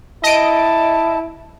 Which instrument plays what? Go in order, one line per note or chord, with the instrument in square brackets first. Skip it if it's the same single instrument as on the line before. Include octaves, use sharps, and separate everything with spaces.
[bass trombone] E4 [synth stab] D#5 D7 [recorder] A5